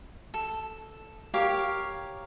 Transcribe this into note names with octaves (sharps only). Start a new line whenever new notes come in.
A4
G4 A#4 C#5 F5